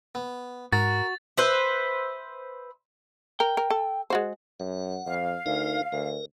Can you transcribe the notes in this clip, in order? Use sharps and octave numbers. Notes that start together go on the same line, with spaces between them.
B3
G#2 F#4 A#4 A6
B4 C5 E5
A#4 G5
A#4
A4
G#3 F#4 C5
F#2 F#5
F2 F5
D2 D#4 A#4
D2 A#4